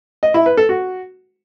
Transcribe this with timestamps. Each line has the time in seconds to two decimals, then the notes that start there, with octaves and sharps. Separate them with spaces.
0.23 D#5
0.34 E4
0.46 B4
0.57 A4
0.69 F#4